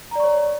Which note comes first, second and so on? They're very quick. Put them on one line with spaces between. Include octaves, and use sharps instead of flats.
A#5 D5 C#6 C#5